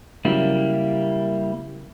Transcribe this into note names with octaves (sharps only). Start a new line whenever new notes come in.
C#3 F#3 G3 A#3 E4